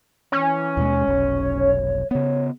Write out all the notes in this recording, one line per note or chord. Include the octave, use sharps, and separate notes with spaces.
E3 C#4
D#2 B2 G#3
F1 B1 C#5
C#3 B3 C#5